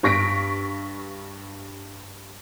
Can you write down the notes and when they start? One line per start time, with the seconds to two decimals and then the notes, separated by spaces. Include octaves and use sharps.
0.03 G2 C#6 A#6 B6 D7